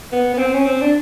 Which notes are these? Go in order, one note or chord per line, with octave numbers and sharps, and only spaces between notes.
B3
B3
C4
C#4
C4
D4